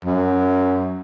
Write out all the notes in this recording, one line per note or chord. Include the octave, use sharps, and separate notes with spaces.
F#2